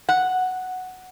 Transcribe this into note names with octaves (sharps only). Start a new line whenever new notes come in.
F#5